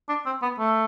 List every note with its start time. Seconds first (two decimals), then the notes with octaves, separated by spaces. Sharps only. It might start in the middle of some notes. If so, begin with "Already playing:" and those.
0.09 D4
0.26 C4
0.42 B3
0.59 A3